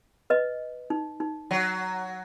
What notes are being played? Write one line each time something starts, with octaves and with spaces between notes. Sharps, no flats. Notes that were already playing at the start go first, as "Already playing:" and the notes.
B4 D#5
D#4
D#4
F#3